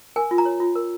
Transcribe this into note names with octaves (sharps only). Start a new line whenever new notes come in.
A#4 G#5
F4
A#5
C#5
F4
A#4